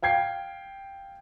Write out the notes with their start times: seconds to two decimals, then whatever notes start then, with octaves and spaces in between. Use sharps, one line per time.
0.02 F5 G5 G#6 C7